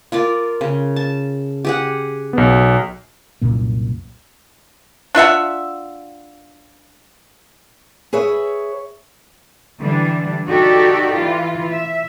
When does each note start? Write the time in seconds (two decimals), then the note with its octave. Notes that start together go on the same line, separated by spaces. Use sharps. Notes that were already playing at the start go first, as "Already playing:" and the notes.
0.12 F4 A#4 D5
0.61 C#3
0.96 A5
1.65 G4 G#4 F#5
2.33 B1 B3
3.41 C2 F#2 A#2 A#3
5.15 D4 F4 E5 F#5
8.13 G#4 B4 C#5 E5
9.80 D3 E3 G3 D4
10.47 D#4 F#4 G4 A4 D5
11.15 E3 F4
11.70 E5